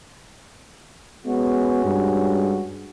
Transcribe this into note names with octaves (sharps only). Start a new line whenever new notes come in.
G#3 B3 C#4 F#4
G2